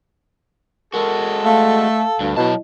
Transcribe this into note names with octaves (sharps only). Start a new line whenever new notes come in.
G#3 F#4 A4 A#4
A3 F5 A5
D2 G2
B2 F#3 E4 D#5 A5